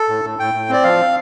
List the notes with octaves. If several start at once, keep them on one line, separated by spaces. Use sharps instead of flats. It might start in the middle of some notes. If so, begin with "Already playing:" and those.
Already playing: A4
A2
A2
A2 G5
A2
C4 D5
F3 F5